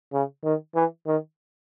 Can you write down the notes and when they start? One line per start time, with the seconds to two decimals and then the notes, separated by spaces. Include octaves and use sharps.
0.13 C#3
0.44 D#3
0.75 E3
1.07 D#3